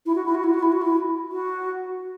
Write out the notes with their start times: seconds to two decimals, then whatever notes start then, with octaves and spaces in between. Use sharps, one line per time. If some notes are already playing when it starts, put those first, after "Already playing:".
0.06 E4
0.15 F#4
0.25 E4
0.35 F#4
0.44 E4
0.54 F#4
0.62 E4
0.72 F#4
0.82 E4
1.32 F#4